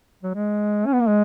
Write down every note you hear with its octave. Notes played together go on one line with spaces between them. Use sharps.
F#3
G#3
C#4
B3
A#3
G#3